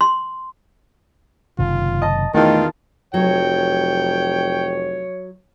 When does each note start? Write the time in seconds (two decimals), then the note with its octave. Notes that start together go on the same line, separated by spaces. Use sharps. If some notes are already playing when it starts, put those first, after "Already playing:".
0.01 C6
1.59 F#1 C3 D#3 F4
2.02 D#5 A5 A#5
2.35 E2 B2 D#3 A3 F4 A5
3.14 F1 F#3 C#5 G5